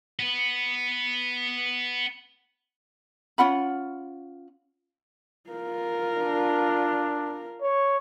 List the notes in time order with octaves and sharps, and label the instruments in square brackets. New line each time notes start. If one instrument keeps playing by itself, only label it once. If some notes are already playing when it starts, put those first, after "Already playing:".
[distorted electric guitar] B3 B4
[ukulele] C#4 F4 F#5 B5
[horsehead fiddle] F4 A#4
[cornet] D4
C#5